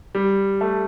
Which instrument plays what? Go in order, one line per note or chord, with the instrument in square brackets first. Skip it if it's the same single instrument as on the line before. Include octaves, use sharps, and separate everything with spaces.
[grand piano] G3
A3